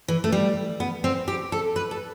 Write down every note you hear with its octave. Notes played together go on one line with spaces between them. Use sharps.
E3
A3
G3
B3
C4
G4
A4
B4
A4